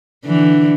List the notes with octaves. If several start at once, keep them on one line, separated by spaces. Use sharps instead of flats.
D3 E3